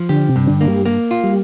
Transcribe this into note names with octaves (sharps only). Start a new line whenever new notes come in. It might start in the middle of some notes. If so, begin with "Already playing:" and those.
Already playing: F3
D3 G4
C3
G2
D3
A#3
G3
A#3
F4
G3